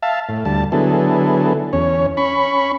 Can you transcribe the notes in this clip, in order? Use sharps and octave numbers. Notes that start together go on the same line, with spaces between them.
E5 F5 A5
A2
D2 G3 A5
D3 F#3 B3 E4 G#4 A4
E2 C#4 C#5
C#4 B5 C#6